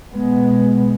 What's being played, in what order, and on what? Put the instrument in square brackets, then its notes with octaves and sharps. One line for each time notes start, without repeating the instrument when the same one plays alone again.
[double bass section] B2 G#3 B3